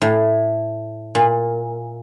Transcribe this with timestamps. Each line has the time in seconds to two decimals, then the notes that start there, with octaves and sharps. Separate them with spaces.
0.01 A2
1.15 A#2